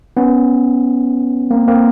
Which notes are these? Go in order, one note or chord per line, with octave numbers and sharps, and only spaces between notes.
B3 C#4
A#3 C4
A#3 C4